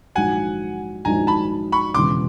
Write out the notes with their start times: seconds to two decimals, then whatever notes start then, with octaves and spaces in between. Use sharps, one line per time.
0.15 A#1 G#2 D#3 F#3 F#5 G#5
1.05 A#1 G#2 D#3 F#3 G#5 A#5
1.27 A5 B5
1.72 B5 C#6
1.94 E1 E2 C#3 C6 D6